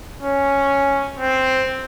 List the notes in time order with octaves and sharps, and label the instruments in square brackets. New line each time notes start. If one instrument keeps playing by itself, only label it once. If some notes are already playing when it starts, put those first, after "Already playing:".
[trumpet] C#4
C4